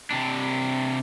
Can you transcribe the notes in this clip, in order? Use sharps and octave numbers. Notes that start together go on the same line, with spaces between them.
C3 D4